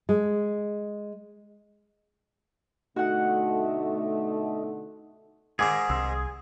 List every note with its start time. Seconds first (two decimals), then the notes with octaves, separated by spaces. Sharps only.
0.09 G#3
2.96 B2 D3 A3 D#4 F#4 F#5
5.59 G#2 D#3 G#4 G#5 D6
5.90 C2 C6 E6